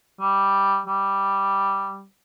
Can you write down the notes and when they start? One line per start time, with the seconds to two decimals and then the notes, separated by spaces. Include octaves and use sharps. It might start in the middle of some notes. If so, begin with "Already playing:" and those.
0.21 G3
0.87 G3